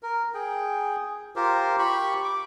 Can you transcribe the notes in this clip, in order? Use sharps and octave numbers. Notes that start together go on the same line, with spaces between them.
A#4
G#4 G5
F4 G4 A#4 C5
G4 B5 C#6
D6